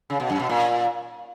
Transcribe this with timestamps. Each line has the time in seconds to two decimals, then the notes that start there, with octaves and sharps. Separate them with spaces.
0.10 C#3
0.20 B2
0.30 F#2
0.40 B2
0.49 A#2